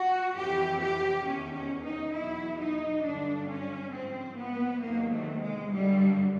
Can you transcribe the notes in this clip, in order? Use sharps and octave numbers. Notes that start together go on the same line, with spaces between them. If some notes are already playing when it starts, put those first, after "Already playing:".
Already playing: F#4
F2 C3 E3 G4
G4
E2 C3 D#3 C#4
C#4
D#4
E2 B2 F#3 E4
D#4
G2 D3 F#3 D4
C#4
G#2 F3 C4
B3
E2 C3 D#3 F#3 A#3
A3
G#3
G2 D3 F#3 G3